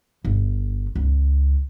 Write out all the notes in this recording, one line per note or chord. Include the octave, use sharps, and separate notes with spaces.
G1
C#2